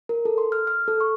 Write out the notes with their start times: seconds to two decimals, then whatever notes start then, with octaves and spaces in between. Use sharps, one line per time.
0.09 A#4
0.25 A4
0.38 C6
0.52 F6
0.67 F6
0.88 A4
1.00 C#6